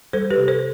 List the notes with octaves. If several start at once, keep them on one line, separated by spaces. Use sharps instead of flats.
G3 A4 C5
G4 B4
C3
A4 C5